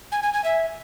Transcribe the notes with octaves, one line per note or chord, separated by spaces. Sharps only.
G#5
G#5
G#5
E5